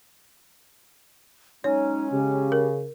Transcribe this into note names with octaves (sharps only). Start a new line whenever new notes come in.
F#3 G#3 C#4 D#4 C#5
C#3 G4
A#4